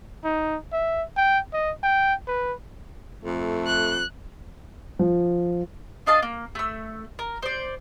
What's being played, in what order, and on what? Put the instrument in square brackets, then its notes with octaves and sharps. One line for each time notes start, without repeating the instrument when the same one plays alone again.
[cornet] D#4
E5
G5
D#5
G5
B4
[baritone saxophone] F2 [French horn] A3
[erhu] F#6
[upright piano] F3
[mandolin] D4 D#5 F5 A5
A#3
A3 E6
A#4
C5 D5